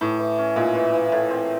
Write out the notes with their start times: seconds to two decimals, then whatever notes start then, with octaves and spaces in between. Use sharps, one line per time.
0.01 A2 E3
0.19 E3
0.38 C#4
0.56 A#2 G#3
0.75 E3
0.94 E3
1.12 A2
1.31 C4